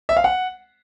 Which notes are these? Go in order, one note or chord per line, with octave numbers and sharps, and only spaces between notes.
E5
F5
F#5